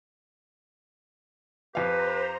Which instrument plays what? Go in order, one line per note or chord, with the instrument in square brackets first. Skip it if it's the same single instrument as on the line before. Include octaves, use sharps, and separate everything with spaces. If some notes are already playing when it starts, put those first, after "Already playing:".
[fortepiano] F2 F5 [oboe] G4 [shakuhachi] B4 [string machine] C5 A#5